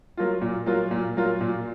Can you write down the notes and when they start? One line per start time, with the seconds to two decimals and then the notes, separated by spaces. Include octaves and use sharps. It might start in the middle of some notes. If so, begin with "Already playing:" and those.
0.17 F#3 A#3 F4
0.41 A#2
0.66 F#3 A#3 F4
0.91 A#2
1.17 F#3 A#3 F4
1.41 A#2